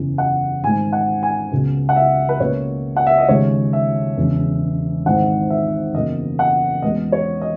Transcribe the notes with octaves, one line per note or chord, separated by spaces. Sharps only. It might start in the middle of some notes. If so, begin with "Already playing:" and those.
Already playing: F#1 E2 C#3 E3
F#5
G#1 G#2 D#3 G#3 G#5
F#5
G#5
C#2 C#3 F#3 B3
F#5
E5
B4
C#2 B2 A#3 C#5
F#5
E5
D#5
D#2 C#3 G#3 C#5
E5
E1 E2 C#3
G#1 G#2 E3 F#5
E5
F#1 E2 B2 A#3 D#5
F#5
E2 B2 G#3 B3 D#5
C#5
D#5